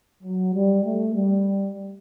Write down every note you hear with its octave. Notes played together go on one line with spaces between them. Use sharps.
F#3
G3
A3
G3